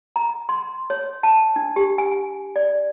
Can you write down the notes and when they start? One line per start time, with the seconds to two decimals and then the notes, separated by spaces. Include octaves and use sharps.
0.16 A#5
0.49 C6
0.90 C#5
1.23 A5
1.56 D4
1.76 G4
1.98 G#5
2.56 D5